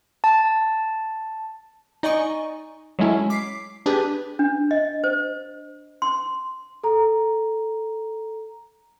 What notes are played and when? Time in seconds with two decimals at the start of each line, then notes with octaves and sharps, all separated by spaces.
0.24 A5
2.03 D#4 D5 D#5 G#5 C#6
2.99 F#3 G#3 A3 C#4 E4
3.30 D6 B6 C7
3.86 D4 G4 G#4 B4
4.39 D4
4.71 D#5
5.04 C5
6.02 C6
6.84 A4 A#5